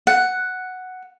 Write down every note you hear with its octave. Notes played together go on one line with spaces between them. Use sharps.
F#5